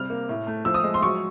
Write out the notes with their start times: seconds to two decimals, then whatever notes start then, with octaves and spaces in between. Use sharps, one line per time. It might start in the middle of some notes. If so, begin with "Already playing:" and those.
Already playing: C3 G3 F6
0.10 A#3
0.29 A2
0.47 A3
0.65 F3 E6
0.74 D#6
0.84 G#3
0.94 C6
1.03 F#3 C#6